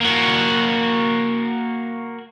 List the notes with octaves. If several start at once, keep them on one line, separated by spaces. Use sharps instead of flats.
A#3 F#4